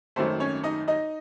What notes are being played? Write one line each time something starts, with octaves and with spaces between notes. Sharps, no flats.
G#1 F#2 D#3 A3 C4 C5
C#4 C#5
D#4 D#5
D#4 D#5